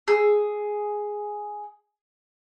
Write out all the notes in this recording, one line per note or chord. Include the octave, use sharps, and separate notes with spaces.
G#4 E6